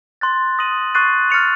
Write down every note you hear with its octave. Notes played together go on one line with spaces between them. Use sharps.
C6 F#6 A6
D#6 A#6 D#7 F#7
C#6 F#6 A6 C7 D#7
F6 A6 C#7 F7